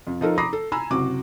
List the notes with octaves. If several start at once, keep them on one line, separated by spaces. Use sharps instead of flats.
F2
F3 D#4 A4 A#4
A#5 B5 D6 D#6 A#6 C7
A4
G#5 A#5 B5 E6
F#1 C3 F#4 D6